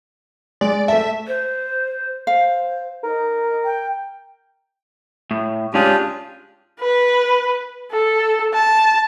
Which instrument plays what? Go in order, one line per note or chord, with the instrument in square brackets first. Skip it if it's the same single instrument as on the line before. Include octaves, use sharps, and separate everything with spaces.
[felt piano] G#3 [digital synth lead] D5
[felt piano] A3 A5 [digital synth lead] E5
[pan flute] C5
[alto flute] C5 [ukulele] F5
[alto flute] D#4 [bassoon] A#4
[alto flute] G5
[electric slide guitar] A2
[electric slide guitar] G#2 C#4 G#4 [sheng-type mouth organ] D4 F4 G4
[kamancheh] B4
A4
A5